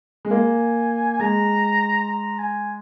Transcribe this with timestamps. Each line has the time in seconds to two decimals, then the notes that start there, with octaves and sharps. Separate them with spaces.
0.25 G#3
0.31 A#3 G#5
1.13 G#5
1.19 G#3 A#5
2.08 A#5
2.39 G#5